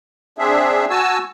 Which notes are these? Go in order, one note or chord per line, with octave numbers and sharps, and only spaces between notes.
C4 D4 G#4 E5
F#4 G#5 A5 E6